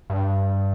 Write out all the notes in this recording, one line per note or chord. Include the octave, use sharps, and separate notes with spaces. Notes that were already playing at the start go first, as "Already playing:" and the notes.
G2